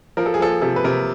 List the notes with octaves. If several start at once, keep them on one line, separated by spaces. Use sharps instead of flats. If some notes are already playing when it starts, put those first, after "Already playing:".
F3 A#4
A4
G#4
F3 A4
C3 A4
B4
C3 A#4